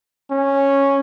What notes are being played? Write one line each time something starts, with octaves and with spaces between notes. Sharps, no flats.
C#4